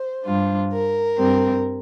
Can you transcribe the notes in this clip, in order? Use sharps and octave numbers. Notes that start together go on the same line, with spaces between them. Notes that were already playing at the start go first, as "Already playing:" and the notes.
Already playing: C5
G2 G3 D4 F4
A#4
G2 G3 C4